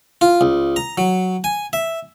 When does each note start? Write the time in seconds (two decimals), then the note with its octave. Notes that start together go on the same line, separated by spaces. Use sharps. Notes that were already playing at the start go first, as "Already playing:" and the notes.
0.21 F4
0.41 C#2
0.76 A#5
0.98 F#3
1.44 G#5
1.73 E5